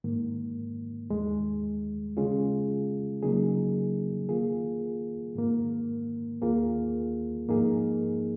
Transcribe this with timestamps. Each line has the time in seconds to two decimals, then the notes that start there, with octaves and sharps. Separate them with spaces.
0.04 G#2 D#3 A#3
1.10 D#2 D#3 G#3
2.17 C#3 G#3 C#4 F4 G#4
3.23 C#3 F#3 A#3 D#4 G#4
4.29 D#3 A#3 F4 G#4
5.35 G#2 D#3 A#3
6.42 D#2 D#3 A#3 F4 G#4
7.48 G#2 F3 A#3 D#4 G#4